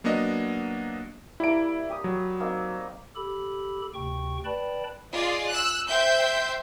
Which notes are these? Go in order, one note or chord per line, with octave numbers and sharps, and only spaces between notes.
F#3 A#3 B3 D4 D#5
G3 A#3 E4 A#5 D7
G4 D#6
F#3
A#3 C4 D#4
G4 A4 B5
D2 C3 G5 C#6
B4 D5 G5 A5 B5
F4 G#4 D5 D#5
E6 F#6
C5 E5 G5 G6